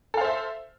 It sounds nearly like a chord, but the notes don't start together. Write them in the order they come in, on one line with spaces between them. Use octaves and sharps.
A4 F5 C5 E5